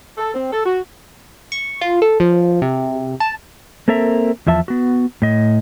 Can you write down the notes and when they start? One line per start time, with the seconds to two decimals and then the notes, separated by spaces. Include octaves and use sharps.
0.18 A4
0.34 C4
0.52 A4
0.65 F#4
1.52 C#6
1.81 F4
2.02 A4
2.20 F3
2.62 C3
3.20 A5
3.88 A#3 C4 A4 A#4 E5 A#5
4.47 E2 F3 E5 A5
4.68 B3 F#4
5.22 A2 D#5